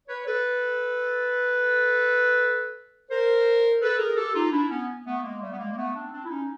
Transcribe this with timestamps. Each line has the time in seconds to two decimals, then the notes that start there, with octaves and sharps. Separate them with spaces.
0.08 B4 C#5
0.26 A4 B4
3.11 A#4 C5
3.82 A4 B4
3.99 G#4 A#4
4.17 G4 A4
4.35 D#4 F4
4.52 D4 E4
4.70 B3 C#4
5.06 A3 B3
5.24 G#3 A#3
5.41 G3 A3
5.53 B3
5.59 G#3 A#3
5.73 A#3
5.77 A3 B3
5.95 C4 D4
6.12 C4 D4
6.25 E4
6.30 C#4 D#4